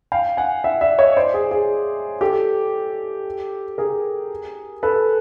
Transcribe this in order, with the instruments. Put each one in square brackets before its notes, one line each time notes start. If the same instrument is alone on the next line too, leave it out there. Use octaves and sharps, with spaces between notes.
[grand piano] F5 G5
F#5 G#5
E5 F#5
D5 E5
C#5 D#5
C5 D5
G#4
G#4
G4 A4
G#4 A#4
A4 B4